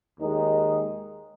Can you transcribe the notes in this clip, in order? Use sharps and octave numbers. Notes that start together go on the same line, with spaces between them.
D#2 D#3 G#3 D#4